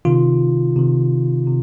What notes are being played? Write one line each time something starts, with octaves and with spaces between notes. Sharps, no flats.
C3 D#3 F4
C3 D#3
C3